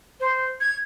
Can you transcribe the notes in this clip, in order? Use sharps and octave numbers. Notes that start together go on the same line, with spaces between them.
C5
G#6